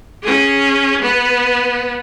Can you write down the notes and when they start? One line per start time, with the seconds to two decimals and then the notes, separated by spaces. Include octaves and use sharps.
0.23 C#4 G#4
1.02 B3